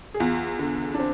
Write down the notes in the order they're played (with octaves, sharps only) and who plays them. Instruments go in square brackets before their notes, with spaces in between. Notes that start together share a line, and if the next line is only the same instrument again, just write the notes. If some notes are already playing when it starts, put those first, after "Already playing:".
[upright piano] G#4
[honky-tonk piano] E2 [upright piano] F4
[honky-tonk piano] D3
[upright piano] D4
C4